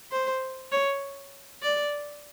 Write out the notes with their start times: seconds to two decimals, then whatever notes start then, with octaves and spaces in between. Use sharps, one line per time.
0.12 C5
0.72 C#5
1.63 D5